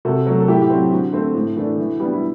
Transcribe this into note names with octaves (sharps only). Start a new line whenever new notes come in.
C3 F#4 A4
F#3 A3
A4
A2 E4 G4
G4
F#3 C4 F#4
D3 F#4
A3 C4
A2
E3 A3 D4
E3
G3 B3 D4
E4